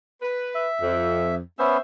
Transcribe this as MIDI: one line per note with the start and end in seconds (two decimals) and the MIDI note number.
0.22 0.65 71
0.55 1.35 76
0.81 1.38 41
1.59 1.77 59
1.59 1.77 61
1.59 1.80 72
1.59 1.80 76